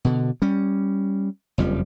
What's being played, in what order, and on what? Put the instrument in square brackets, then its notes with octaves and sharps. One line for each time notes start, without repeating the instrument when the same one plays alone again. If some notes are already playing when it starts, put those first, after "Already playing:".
[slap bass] B2 D3
G3 C#4
F#1 F2 F3 G3